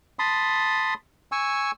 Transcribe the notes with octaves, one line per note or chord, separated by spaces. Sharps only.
A5 B5 C6 D#6
G#5 C#6 E6